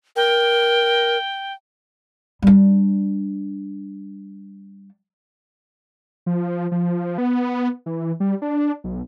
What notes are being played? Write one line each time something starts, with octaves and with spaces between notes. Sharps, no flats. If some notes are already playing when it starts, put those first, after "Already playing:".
A#4 G5
G3 D4
F3
F3
B3
E3
G3
D4
B1